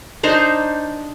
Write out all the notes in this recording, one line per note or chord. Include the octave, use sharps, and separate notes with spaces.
D4 D#4 C5 A#5